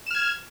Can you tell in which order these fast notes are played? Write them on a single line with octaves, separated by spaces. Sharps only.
E7 F6 G#6